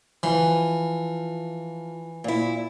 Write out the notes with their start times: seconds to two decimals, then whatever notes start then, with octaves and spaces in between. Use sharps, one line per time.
0.23 E3 F3
2.24 A#2 E4